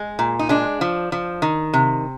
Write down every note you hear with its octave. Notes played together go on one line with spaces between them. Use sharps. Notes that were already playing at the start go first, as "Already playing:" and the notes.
Already playing: G#3
A#2
D#4
G#3 D4
F3
F3
D#3
C3